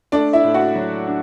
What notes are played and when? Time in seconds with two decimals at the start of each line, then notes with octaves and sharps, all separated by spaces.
0.12 A3 D4 D5
0.33 E4 E5
0.44 A2
0.54 F#4 F#5
0.75 F#3
1.07 D4